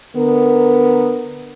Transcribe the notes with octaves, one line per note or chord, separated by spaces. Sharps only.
D3 B3 A#4